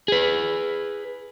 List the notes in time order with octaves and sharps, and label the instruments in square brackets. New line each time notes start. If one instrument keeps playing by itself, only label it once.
[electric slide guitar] G#4 B4